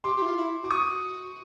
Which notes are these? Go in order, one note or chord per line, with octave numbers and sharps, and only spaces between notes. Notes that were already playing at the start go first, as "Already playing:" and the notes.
G4 C6 D6
G4
E4
F4
E4
F#4 D6
C#6 D#6